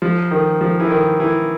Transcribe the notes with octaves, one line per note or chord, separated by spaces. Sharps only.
F3
D#3
F3
E3
D#3
E3